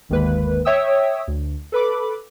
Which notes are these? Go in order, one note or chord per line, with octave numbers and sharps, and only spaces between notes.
G1 D#2 D#3 G#3 A#3 B4
C#5 E5 G5 D#6 E6
D2
A4 B4 B5 D6